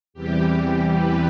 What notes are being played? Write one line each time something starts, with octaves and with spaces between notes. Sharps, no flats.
E2 C3 E3 G3 G4
G4
B4